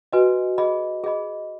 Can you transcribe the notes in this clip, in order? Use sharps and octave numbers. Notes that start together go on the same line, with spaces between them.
F#4 B4 D#5 G#5
G#4 D#5 B5
G#4 D#5 B5